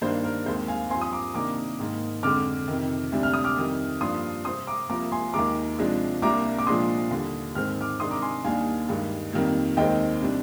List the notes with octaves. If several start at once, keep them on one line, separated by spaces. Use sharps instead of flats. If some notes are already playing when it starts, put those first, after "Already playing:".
G2 D#3 A#3 D4 C5
A#4
D#2 D#3 G#3 C4 C5
F5 G#5
G2 F3 C4 G#5 C6
D#6
A#5 D6
C3 D#3 A#3 D4 A#5 D6
G#2 D#3 A#3
F2 D3 G#3 D6 F6
F2 C3 D#3
D2 C3 G3 D4
F6
D#6
D6 F6
F2 D#3 G3
G2 F3 A#3 D4 C6 D#6
C3 G3 C4 C6 D#6
A#5 D6
C2 C3 F3 A#3 A#5 D6
G#5 C6
D#2 D#3 G#3 A#5 D6
C3 F3 G#3 D4
C2 C3 G3 A#3 D4 A#5 D6
D6
A#2 F3 G#3 D4 C6 D#6
D#2 D3 G3
G#2 D#3 G#3 C4 F6
D6 F6
C3 D#3 G#3 D4 C6 D#6
A#5 D6
G#5 C6
D#2 D#3 G3 A#3 D4 F5 G#5
G2 D#3 G#3
F2 D#3 G3 A#3
D#2 D#3 G#3 C4 D#5 G5
C3 G3 D4